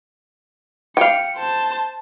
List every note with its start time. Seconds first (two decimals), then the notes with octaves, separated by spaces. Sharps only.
0.97 F5 G5 C#7
1.37 C5 A5